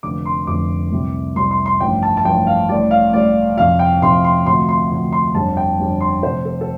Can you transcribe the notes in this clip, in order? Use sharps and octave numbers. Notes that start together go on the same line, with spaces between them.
F1 F2 D3 F3 D6
C6
F1 F2 D3 F3 D6
C2 C3 G3
C2 C3 G3 C6
C6
C6
A1 G2 F3 G5
A5
A5
A1 G2 F3 G5
F5
A1 A2 G3 D5
F5
A1 A2 G3 D5
F2 C3 F3 F5
G5
F2 C3 F3 C6
C6
D2 C3 F3 C6
C6
D2 C3 F3
C6
G1 F2 D3 G3 A5
G5
G1 F2 D3 G3
C6
F1 F2 C3 G3 C5
A4
A4